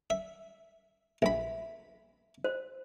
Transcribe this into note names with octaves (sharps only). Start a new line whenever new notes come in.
E5
A#1 E5 B5
C5